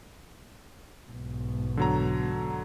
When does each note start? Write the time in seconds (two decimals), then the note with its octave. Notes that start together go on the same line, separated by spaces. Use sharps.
1.11 B1 G#2
1.77 D3 F#3 A#5